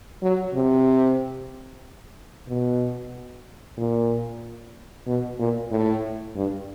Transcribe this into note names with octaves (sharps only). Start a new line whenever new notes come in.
F#3
C3
B2
A#2
B2
A#2
A2
G2